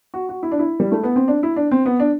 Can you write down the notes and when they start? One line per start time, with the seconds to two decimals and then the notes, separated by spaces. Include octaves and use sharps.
0.14 F#4
0.29 F#4
0.43 E4
0.51 D4
0.59 E4
0.80 G3
0.92 A3
1.03 B3
1.16 C4
1.28 D4
1.43 E4
1.56 D4
1.71 C4
1.86 B3
2.00 D4